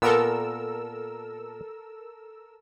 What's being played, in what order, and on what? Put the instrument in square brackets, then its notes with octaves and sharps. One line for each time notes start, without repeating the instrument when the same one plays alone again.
[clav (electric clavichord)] A#2 B3 [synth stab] A4 A#4 E6